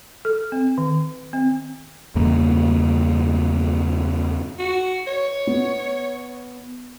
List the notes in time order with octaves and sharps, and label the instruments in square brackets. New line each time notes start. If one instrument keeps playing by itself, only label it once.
[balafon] A4
C4
D#3
C4
[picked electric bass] E2 G2 C#3 A#3
[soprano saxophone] F#4
C#5
[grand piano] B3